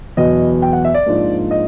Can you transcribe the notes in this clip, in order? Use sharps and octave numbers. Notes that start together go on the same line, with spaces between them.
E2 B2 F#3 B3 D#5
G5
F#5
E5
D5
G#2 F3 A#3 D4 F4
D#5